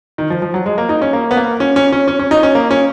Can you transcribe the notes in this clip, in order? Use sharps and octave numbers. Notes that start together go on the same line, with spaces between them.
D#3
F3
F3
F#3
G#3
A#3
D#4
C#4
A#3
B3
A#3
C#4
C#4
C#4
C#4
C#4
D#4
C#4
A#3
C#4